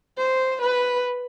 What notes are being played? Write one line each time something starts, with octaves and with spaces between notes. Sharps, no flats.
C5
B4